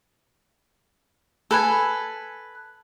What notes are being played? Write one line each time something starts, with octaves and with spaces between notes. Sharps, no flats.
A4 B4 G#5